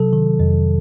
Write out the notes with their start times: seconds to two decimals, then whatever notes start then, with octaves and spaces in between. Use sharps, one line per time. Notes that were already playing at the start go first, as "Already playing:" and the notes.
Already playing: C3 F#3 A4
0.13 D#3
0.40 F2